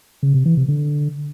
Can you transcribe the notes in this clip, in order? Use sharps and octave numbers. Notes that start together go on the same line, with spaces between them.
C#3
C3
E3
C3
D3